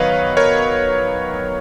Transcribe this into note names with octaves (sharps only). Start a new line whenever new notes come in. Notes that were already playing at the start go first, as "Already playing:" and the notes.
Already playing: D#3 F#3 B3 B4 C#5 D#5 F5
A#4 C#5